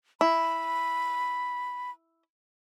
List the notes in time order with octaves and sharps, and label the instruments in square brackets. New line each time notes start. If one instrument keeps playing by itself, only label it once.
[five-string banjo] E4 [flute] B5